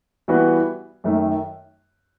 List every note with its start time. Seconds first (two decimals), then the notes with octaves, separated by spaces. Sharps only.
0.28 E3 G3 B3 F#4
1.04 F#2 D#3 A3